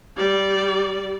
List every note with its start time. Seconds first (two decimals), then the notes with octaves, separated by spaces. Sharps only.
0.16 G3 D5